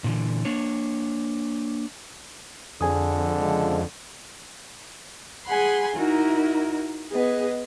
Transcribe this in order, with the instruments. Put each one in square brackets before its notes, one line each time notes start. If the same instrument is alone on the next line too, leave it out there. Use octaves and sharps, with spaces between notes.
[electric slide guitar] A#2 D3 E3
A#3 D4 C#5
[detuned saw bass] F2 [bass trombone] D3 [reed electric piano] G#4 G#5 D#6
[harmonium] C#3 F3 G#3
[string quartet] G#4 F#5 G#5 B5 C6
D#4 E4 F#4 A#4
B3 G#4 B4 D#5